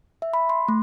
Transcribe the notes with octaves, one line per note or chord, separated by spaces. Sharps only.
E5
B5
C6
A3